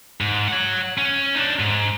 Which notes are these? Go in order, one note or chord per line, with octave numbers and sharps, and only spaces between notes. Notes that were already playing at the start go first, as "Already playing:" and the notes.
G#2
C#5 F#5
C#4
D4 D#4
G#2